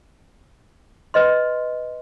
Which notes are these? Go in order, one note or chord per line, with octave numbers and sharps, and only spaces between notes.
B4 D#5 C6